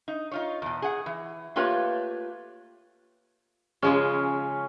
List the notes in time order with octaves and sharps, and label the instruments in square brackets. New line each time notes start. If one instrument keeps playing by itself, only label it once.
[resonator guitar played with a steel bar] D#4
D#4 F4 C#5
E2 B2
G#4 F#5
E3
A3 A#3 F4 G4 B4 C#5
[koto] C#3 F3 G#3 [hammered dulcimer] C#4